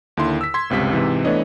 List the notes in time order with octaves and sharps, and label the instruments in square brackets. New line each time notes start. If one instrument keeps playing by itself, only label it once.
[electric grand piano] D#2 D3 E4 C6
E6 B6
C6 G#6 B6
G1 C#2 C3 B6
G#2 C3 E3
E3 A3 B3 D4 C#5 D#5